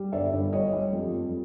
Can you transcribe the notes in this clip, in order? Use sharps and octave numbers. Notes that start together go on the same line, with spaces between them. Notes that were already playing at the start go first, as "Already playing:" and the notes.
Already playing: G3
G1 D5 E5
G1
G3 C#5 D#5
G3
F2
F2